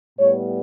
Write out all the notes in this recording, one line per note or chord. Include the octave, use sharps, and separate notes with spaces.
A2 G3 B3 C#5